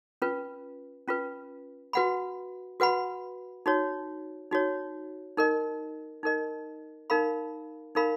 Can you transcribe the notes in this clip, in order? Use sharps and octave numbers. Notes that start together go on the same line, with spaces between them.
C#4 F4 B4
C#4 F4 B4
F#4 B4 F#5 B5
F#4 B4 F#5 B5
D#4 F#4 C#5
D#4 F#4 C#5
D#4 A#4 D#5
D#4 A#4 D#5
D#4 A#4 F5 B5
D#4 A#4 F5 B5